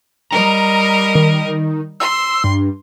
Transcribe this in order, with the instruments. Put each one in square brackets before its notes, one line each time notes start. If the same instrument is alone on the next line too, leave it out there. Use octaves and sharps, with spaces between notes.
[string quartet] G3 A#4 D#5 [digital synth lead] A#5
[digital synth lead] D#3
[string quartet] C6 [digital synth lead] E6
[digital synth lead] G2